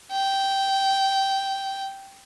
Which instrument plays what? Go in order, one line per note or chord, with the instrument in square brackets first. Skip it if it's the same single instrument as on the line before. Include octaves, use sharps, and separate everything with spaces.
[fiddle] G5